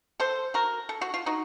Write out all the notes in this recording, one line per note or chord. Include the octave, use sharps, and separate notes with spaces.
A4 C5
F#4 A#4
A4
F#4
F4
D#4 F#4